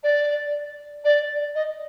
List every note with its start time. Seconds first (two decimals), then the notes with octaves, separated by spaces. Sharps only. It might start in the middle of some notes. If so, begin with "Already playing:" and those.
0.03 D5
1.04 D5
1.55 D#5